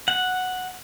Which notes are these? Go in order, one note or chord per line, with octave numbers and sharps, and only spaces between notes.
F#5